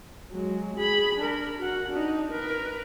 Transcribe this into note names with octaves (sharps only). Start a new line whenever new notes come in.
F#3 G#3
G#4 B5
D4 A#4
F#4 F#5
D4 D#4
A#4 B4